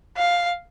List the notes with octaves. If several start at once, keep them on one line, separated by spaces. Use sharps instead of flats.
F5